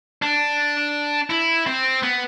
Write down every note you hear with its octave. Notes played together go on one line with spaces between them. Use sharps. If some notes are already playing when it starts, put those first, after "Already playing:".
D4
E4
C4
B3